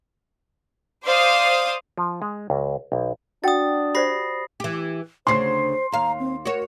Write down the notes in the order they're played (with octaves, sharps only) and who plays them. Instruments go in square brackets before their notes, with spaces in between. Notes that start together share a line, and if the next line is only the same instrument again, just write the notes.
[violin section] C5 D5 F5 D#6
[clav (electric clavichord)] F3
G#3
C#2
B1
[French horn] D4 [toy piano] F#4 F#5 G5 [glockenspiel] D#6 A6
[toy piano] G4 C5 D5 [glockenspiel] B5 A#6 C7
[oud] E3 G4
[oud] D2 C#3 [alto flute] C5 [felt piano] C6 C7
[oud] D#2 F5 [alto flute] A#5
[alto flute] C4
[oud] F#4 C#5 [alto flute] A#4